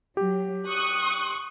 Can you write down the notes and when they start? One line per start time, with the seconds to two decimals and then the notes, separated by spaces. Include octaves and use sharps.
0.17 F#3 G4
0.66 C#6 D#6 F#6